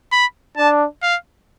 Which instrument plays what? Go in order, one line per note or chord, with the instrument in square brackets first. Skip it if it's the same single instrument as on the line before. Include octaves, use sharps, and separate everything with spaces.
[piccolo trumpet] B5
[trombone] D4 [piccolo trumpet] A5
[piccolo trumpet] F5